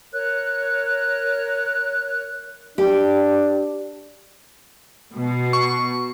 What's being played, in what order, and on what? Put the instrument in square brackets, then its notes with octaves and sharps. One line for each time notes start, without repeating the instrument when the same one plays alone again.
[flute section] A#4 C#5 F#6
[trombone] D4 [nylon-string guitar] G4
[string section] B2
[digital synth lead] C#6